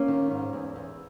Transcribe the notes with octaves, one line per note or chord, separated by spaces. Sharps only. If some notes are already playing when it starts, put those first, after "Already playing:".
Already playing: A#3 C#4
D#3
G#2
E2
E2